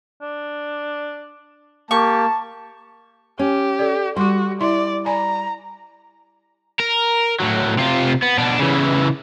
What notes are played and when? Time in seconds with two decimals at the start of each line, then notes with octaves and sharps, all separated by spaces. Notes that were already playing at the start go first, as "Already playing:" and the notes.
0.22 D4
1.91 A#3 G4 A5 C#6
3.39 C#4 G4
3.79 A4 D5
4.16 G3 F#4 C6 D6
4.61 E4 D5 E5 C6
5.06 D5 G#5 A#5 B5
6.79 A#4
7.40 A2 F#3
7.78 C3 F4
8.22 B3
8.38 B2 D4
8.59 C#3 E3